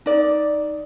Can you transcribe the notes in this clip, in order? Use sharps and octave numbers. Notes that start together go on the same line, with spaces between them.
D#4 D5